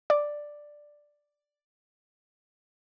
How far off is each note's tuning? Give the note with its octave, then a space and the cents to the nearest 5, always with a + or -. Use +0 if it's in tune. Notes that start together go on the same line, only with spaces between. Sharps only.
D5 +5